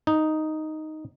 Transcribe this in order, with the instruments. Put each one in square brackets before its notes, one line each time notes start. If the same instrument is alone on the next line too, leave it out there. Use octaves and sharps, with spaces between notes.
[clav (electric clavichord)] D#4